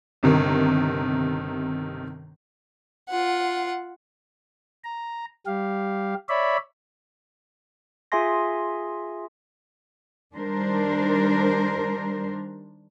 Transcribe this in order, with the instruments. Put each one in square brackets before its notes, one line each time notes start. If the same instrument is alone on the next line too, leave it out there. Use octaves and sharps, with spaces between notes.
[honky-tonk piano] G1 C3 D#3
[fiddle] F4 F#5
[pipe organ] A#5
G3 G4 F5
C#5 D5 E5 B5
[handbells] F4 G#4 E5 G#5 C6 A#6
[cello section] D#3 G3 D4 A#4 C5